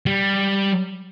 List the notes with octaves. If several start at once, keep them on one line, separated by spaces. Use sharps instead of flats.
G3